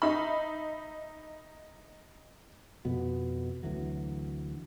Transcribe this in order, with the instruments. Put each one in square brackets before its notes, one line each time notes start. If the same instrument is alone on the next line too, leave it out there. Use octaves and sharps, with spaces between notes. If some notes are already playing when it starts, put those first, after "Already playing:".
[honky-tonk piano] D#4 E5 B5
[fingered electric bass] F2 B2 B3
D2 E3 F#3